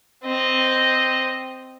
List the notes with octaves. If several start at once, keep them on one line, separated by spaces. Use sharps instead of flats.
C4 D#5